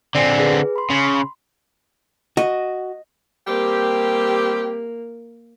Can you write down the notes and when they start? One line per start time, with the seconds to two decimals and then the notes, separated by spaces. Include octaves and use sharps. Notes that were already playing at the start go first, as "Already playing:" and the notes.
0.15 D3 C4 D5 G#5
0.40 G#4 B4
0.76 B5 C6
0.90 C#3
2.37 F#4 D#5
3.48 G3 A#3 C4 G4